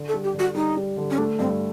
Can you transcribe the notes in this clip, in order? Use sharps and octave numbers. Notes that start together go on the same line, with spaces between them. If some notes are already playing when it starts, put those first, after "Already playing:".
Already playing: D3
A4
G3
G4
D3
F#4
G3 D#4
G3
D3
C#4
A3 D4
G2 C4